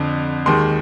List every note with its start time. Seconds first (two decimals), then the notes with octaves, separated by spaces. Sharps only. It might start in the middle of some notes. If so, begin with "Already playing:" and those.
Already playing: F2 D3
0.46 D#2 D#3 G#3 C6